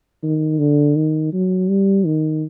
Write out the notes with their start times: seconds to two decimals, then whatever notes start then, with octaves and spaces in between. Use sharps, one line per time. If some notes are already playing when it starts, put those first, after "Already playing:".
0.23 D#3
0.59 D3
0.96 D#3
1.32 F#3
1.69 G3
2.06 D#3